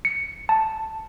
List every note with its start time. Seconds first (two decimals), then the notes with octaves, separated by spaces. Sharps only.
0.05 C#7
0.49 A5